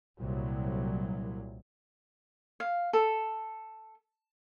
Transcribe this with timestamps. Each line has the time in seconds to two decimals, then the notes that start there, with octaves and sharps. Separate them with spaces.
0.20 C2 A#2 F#3
2.60 F5
2.93 A4